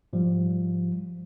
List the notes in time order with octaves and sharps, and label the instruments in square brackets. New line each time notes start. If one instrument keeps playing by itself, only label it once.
[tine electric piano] G#2 F3 G3